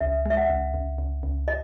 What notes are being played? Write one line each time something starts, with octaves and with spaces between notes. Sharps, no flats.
C#2 E5
G#3 E5
F#5
C#2
C#2
C#2
C#2
D#5